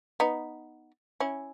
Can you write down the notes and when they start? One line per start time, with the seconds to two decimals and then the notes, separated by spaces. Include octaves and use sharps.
0.20 B3 D#4
1.20 C#4 E4